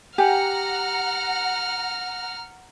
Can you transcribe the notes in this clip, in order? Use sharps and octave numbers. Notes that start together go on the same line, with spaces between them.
G4 F#5 G#5 A#5 F6